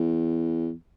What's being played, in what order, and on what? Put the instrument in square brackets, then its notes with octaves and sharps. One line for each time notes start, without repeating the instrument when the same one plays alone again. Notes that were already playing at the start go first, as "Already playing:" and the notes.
Already playing: [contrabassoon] E2